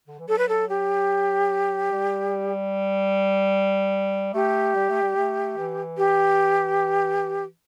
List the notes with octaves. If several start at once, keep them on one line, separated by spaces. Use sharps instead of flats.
D3
E3
F#3 A4
B4
A4
G4
G3
A3 G4
G3
A3
G3
A3
E3
G4